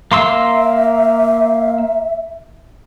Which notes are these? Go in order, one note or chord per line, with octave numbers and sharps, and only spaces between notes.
A#3 E5 C6 E6